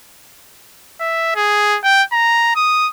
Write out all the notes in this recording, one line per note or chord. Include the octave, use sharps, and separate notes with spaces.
E5
G#4
G5
A#5
D#6